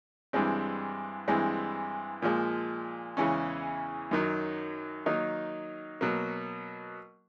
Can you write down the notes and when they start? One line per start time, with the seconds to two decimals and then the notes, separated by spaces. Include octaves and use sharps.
0.33 G2 E3 G#3 C4
1.28 G2 E3 G#3 C4
2.22 A#2 F3 G#3
3.17 E2 C#3 E3 G#3 C#4
4.11 F#2 D#3 F#3
5.06 D#3 F#3 A#3 D#4
6.01 B2 F#3 A#3